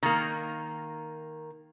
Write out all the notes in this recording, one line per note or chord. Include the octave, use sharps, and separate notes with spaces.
D#3 A#3